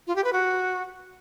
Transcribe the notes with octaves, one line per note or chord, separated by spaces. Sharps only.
F4
G4
B4
F#4